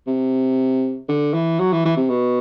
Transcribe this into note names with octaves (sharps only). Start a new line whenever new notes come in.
C3
D3
E3
F#3
E3
E3
C3
B2